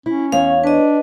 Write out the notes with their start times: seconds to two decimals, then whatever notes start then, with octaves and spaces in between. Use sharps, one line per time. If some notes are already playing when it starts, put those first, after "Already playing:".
0.06 C#4 E4
0.32 E2 C#5 F5
0.64 D4 B4 D#5